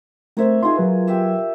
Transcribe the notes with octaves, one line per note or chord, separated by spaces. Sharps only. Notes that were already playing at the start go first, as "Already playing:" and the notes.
A3 C4 A#4 C5 C#5 E5
D#4 F4 G#4 C6
F#3 B4
G4 E5 E6